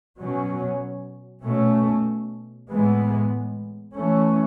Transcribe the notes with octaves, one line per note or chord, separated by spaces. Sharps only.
B2 F#3 C#4
B2 A3 C#4
A2 E3 G#3 B3
E3 A3 C#4